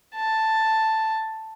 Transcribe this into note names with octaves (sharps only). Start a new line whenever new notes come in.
A5